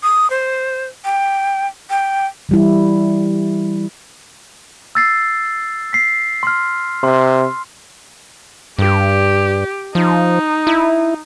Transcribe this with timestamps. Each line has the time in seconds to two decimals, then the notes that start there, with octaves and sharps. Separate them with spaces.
0.03 D#6
0.30 C5
1.05 G5
1.90 G5
2.49 E3 G3 E4
4.95 E6 A6 C7
5.93 B6 C7
6.43 C6 F6
7.03 C3 C6
8.79 G2 G4
9.95 F3 D#4
10.67 E4